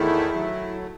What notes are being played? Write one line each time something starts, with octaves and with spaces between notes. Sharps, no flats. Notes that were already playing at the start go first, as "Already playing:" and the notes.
Already playing: E2 D#3 A3 E4
F#3 A3